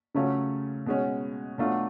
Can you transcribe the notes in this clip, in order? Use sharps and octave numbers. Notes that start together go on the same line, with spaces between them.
C#3 F#3 A3 C#4 F4
B2 G#3 C#4
B2 F#3 A3 D4 F4